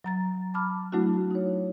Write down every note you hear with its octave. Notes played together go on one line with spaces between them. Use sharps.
F#3 A#5 A6
A5 B5 D6 F6
F#3 A3 D4 E4 F#4
D#4 C#5